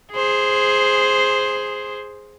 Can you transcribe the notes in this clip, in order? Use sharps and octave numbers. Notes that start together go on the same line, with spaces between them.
G#4 C5